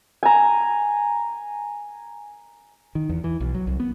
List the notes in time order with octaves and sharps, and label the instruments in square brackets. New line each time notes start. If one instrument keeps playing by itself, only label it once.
[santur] G#5 A#5
[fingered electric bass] D#3
E2
E3
B1
F#3
C2
B3